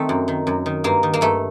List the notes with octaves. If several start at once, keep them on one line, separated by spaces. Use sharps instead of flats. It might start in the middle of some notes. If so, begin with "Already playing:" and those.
Already playing: D#3 A3 C4
F#2
D#3
F#2
D#3
G2 A#3
D#3
A#3
G2 A3